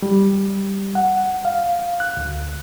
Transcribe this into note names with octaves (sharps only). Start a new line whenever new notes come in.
G3
F#5
F5
F#6
D2